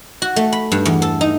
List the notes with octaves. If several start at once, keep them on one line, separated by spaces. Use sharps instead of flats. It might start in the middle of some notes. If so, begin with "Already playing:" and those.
F#4
A3
B5
G2
E2
A4
D#4